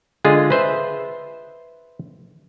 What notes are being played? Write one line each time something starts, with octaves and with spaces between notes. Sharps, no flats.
D3 G#3 F4 G#4
B4 C5 E5